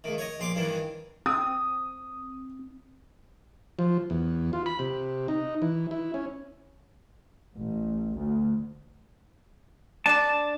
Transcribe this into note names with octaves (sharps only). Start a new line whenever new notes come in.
C#2 D#3
C#5 D#5
A#1 C6 D6
G2 D#3 E3
C4 D#6
F3
E2
F4
B5
C3
D#4
E3
E4
C#4
A1
D2
D4 D5 A5